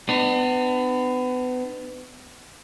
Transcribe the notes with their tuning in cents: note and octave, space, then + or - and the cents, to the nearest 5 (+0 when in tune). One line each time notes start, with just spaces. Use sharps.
B3 +30 D4 +40